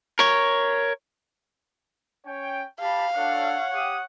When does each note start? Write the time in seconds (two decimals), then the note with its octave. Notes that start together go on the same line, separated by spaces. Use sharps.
0.19 A#4 C#5
2.24 C#4 C#5 G5
2.80 G4 F5 A5 B5
3.16 D4 A4 C#5 F#5
3.74 G4 D#6